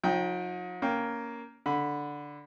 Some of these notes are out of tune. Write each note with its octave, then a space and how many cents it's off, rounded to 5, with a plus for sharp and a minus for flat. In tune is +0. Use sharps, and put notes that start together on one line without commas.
F#3 -45 D#4 +25 G5 +0
A#3 +0 C#4 +10 G5 +0
D3 +0 B5 +0